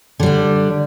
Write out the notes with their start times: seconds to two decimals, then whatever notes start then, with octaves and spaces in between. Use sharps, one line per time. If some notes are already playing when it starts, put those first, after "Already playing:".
0.20 D3
0.23 G3
0.26 D4